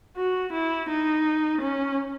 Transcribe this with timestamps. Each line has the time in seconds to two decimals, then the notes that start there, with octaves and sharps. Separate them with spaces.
0.17 F#4
0.53 E4
0.89 D#4
1.62 C#4